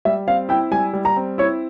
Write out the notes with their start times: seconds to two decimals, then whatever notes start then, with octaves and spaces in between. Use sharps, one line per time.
0.05 G3 E5
0.27 C4 F5
0.49 E4 G5
0.71 G3 G#5
0.93 G3
1.05 A#5
1.16 C4
1.38 E4 C#5